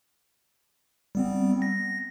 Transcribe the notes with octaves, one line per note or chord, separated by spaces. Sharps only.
G3 B3 C4
A#6